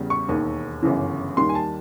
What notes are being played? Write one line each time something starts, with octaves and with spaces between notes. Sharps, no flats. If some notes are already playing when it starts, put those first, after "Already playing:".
Already playing: E2 C#3 G3
C#6
E1 D#2 D#3
G1 F#2 C#3 E3
D#2 D#3 G3 C6
G#5
A5